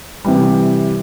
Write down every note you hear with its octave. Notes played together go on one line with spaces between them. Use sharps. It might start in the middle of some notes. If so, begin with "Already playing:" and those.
C3 E3 G3